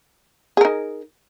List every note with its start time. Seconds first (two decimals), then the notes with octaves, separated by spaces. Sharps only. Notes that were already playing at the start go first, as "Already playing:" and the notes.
0.57 G#4
0.61 A#4
0.65 D#4